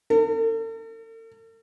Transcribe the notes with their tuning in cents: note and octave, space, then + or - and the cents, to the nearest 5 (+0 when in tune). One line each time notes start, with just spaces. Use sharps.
A4 +45